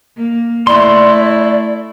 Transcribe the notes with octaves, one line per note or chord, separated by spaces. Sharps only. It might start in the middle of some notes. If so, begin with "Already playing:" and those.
A#3
A3 E4 D5 C6